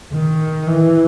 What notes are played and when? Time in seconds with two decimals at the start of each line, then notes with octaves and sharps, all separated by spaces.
0.13 D#3
0.67 E3